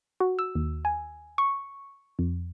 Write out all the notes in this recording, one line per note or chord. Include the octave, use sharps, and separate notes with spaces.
F#4
E6
D#2
G#5
C#6
F2